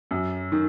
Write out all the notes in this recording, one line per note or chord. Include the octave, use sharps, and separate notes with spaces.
F#2
D#3